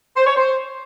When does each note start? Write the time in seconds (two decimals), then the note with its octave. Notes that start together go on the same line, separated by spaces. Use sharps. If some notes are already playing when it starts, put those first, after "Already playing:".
0.17 C5
0.26 C#5
0.36 C5